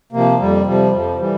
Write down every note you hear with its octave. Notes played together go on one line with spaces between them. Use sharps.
C3 F3 A#3
F2 G3
C3 F3 G3
F2 F3
E3 G3